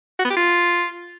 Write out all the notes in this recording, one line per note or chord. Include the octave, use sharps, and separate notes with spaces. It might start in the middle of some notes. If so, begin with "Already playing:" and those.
F#4
B3
G4
F4